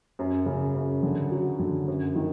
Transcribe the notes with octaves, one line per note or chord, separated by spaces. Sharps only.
F#2
C#3
F#2
D3
F#3
D3
F#2
D#3